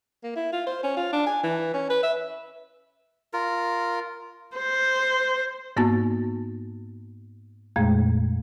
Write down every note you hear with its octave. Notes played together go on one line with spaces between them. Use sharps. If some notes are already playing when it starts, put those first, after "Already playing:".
A#3
E4
F4
C5
C#4
F4
D4
G#5
E3
C#4
B4
E5
F4 A#4
C5
G#2 A#3 B3 D#4 F#4 A6
F2 A#2 G#3 A3